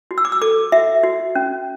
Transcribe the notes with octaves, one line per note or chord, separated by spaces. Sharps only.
F#4
E6
D6
E6
A4 D6
F#4 E5
F#4
C#4